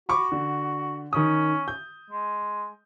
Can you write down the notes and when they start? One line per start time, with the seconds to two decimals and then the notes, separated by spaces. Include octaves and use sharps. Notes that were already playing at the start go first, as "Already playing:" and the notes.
0.09 F#4 B5 C#6 D6
0.32 D3
1.13 D#3 C#4 D#6
1.68 G6
2.10 G#3